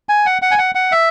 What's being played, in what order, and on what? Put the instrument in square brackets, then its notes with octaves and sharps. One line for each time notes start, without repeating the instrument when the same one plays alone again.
[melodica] G#5
F#5
F#5
G#5
F#5
F#5
E5